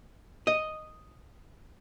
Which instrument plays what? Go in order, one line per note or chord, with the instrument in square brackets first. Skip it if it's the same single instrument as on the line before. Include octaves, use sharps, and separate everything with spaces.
[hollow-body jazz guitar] D#5